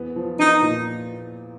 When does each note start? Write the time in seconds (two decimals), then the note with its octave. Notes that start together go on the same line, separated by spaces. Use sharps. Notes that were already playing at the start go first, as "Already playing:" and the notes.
Already playing: E2 B3
0.16 F3
0.39 F3 D#4
0.62 A#2